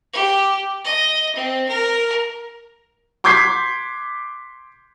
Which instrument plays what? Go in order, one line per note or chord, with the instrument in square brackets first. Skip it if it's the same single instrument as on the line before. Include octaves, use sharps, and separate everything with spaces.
[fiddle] G4
D#5
C4
A#4
[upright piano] C6 D6 G6 G#6 B6 C7